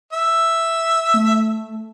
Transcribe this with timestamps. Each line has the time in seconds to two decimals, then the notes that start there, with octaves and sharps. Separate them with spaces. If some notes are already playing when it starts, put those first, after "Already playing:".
0.13 E5
1.14 A3